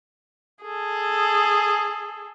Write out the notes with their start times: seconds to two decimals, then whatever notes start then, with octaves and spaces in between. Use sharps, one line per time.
0.63 G#4 A4